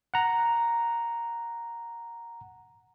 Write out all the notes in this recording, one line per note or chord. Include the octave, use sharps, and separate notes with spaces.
F#5 A#5